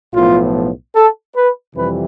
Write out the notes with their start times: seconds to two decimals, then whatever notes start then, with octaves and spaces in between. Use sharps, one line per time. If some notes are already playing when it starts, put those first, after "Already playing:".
0.14 B1 A2 F3 B3 F4
0.95 A4
1.36 B4
1.75 F2 C3 E3 G3 B4